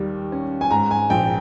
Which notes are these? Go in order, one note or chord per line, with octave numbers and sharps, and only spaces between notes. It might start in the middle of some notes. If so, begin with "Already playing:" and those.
Already playing: D#2 D#3 G3
C#4
G#5
G#2 A#5
G#5
A#1 G5